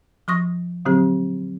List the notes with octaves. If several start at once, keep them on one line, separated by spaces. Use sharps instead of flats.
F3 C6 C#6 D#6 A#6
A#2 D3 F#3 C4 G4